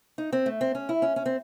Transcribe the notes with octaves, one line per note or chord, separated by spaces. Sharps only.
D#4
C4
A3
C4
C#4
E4
C#4
C#4
C4